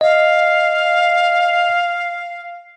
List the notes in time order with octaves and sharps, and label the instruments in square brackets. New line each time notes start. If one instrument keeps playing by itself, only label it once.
[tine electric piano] D#5 [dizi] F5